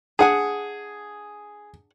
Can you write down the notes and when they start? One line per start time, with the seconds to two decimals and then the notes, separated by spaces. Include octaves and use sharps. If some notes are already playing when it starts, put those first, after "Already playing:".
0.19 D4 G#4 F#5 G#5